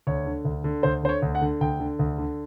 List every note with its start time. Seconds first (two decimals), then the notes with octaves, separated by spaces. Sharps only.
0.07 D2 C#5
0.26 D3
0.45 D2
0.64 D3
0.83 D2 C5
1.03 D3 C5
1.09 C#5
1.22 D2
1.35 F#5
1.41 D3
1.61 D2 G5
1.80 D3
1.99 D2
2.18 D3